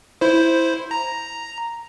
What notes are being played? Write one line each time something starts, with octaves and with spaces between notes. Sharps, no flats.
E4 C5
A#5